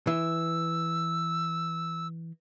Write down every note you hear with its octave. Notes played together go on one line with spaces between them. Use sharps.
E3 E6